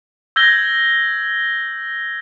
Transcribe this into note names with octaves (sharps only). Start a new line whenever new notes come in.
E6 G6 G#6 A#6 G7